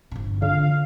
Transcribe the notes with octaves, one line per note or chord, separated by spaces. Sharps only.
G1 C3
D3 F4 F5